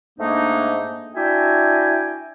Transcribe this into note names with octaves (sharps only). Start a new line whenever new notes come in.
G#2 A3 A#3 D4 D#4
D4 E4 F#4 E5 G5 G#5